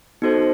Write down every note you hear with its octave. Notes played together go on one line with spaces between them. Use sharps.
B3 D#4 F#4 A4 C5